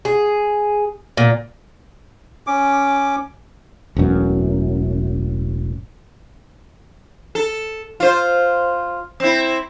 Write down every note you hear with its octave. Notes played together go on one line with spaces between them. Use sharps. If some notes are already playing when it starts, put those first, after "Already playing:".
G#4
A#2
C#4 D6
E1 A1 F#2
A4
F4 C5
C4 E4